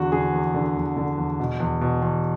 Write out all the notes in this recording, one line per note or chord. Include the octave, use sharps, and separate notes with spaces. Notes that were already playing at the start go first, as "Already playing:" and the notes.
Already playing: E2 D3 F#4
D3 G#4
E2
D3
E2
D3
E2
B2
E2
B2
E2